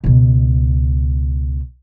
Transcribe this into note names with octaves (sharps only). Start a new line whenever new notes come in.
C#2 B2